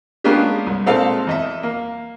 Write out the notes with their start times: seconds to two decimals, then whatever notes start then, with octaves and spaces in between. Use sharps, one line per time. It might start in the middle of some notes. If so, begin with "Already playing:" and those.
0.24 G#3 A#3 B3 C#4 D4 G4
0.66 C2
0.86 A#2 G#3 C4 D#4 A4 F5
1.27 E2 D#5 E5
1.63 A#3